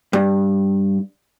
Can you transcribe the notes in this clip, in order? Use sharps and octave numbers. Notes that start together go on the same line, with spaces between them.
G2